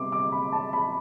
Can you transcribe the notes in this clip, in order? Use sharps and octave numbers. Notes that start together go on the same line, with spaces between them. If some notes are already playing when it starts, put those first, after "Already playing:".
Already playing: C3 G3 B3 C6 D6
D6
B5
A5
B5